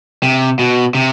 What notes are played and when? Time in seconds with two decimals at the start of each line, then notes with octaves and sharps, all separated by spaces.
0.23 C3
0.59 B2
0.95 C3